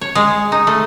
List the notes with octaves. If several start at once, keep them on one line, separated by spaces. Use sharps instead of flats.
C#5
G#3
D#4
A3